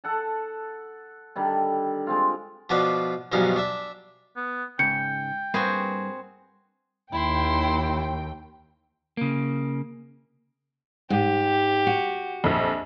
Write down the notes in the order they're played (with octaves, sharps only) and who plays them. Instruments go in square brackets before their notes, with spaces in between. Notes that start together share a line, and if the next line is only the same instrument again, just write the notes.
[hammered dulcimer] A4 F#5 A5
D3 D#3 G3
G#3 C4 F4
[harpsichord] B2 F3 D4 B4 D6
B1 G2 B2 F3 C#4 D#4
D4 E5
[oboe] B3
[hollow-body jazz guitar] G#2 C#3 [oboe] G5 [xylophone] G6 C#7
[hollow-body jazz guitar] G2 A#3 B4 [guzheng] C4 F#4 G#4
[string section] D#2 G5 [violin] E4 C6
[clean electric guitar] C#3 A#3
[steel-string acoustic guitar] G#2 [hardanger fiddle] G4
[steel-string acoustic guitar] F#4
[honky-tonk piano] A#1 F2